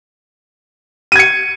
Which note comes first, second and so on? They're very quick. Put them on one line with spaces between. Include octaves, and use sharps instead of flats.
D#7 G#6 C#7